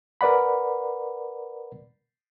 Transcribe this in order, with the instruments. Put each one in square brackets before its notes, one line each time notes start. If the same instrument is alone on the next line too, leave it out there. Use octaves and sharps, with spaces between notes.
[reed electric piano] A#4 B4 D5 F#5 B5